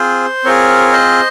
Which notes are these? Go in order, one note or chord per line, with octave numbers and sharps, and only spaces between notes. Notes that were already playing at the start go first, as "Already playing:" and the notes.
Already playing: C4 F4 G#4 C5
C4 F4 G#4 A#4 C#5
C5 D#5